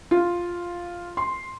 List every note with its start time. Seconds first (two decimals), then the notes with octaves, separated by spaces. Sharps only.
0.11 F4
1.17 C6